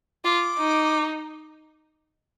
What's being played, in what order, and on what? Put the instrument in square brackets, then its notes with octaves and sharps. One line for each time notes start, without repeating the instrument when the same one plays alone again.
[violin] F4 [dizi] D6
[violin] D#4